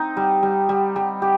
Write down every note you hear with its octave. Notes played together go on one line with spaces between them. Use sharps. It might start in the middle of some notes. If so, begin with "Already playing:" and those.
Already playing: C4 D#4
G3
G3
G3
G3
G4